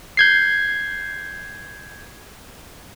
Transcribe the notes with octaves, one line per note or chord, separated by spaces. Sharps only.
G6 G#6 C7